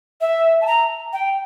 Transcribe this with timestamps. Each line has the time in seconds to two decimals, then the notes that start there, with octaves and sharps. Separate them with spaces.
0.21 E5
0.61 A5
0.67 A#5
1.13 G5